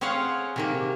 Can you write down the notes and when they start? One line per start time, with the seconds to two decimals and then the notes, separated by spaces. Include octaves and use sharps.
0.01 C4 C#4 G#4 C#5 F5 F#5
0.56 C3 D#3 A#3